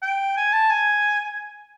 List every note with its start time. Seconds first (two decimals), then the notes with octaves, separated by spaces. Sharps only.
0.02 G5
0.37 G#5
0.53 A5
0.70 G#5